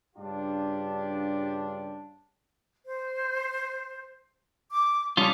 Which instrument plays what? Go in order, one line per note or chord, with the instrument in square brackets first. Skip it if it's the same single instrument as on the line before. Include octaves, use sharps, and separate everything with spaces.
[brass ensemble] G2 C#3 D4 F4 G4
[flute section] C5
D6
[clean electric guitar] G3 C#4 F4 [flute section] A5 D6 D#6